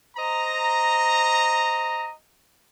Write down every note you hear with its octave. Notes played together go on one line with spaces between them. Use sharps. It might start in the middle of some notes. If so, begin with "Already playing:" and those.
C5 D#5 A#5